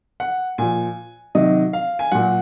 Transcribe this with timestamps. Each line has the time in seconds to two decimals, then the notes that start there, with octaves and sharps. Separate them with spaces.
0.20 F#5
0.58 A#2 F3 G#5
1.35 C3 D#3 F#3 D#5
1.73 F5
1.99 G#5
2.12 A#2 F#3 F#5